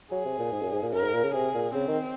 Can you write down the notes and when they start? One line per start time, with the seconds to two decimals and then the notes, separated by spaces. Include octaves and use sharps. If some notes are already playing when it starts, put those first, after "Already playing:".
0.12 F#3 G#4
0.25 C3
0.39 A#2
0.52 G#2
0.62 F#2
0.73 G#2
0.83 A#2
0.93 F#2 A#4
1.03 G#2
1.14 A#2
1.24 C#3
1.34 C3 G#4
1.55 A#2
1.74 C#3 C4
1.88 D#3